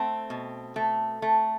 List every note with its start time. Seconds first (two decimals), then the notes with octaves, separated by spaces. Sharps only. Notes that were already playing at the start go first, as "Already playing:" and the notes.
Already playing: A3 C4
0.30 B2
0.76 A3
1.22 A3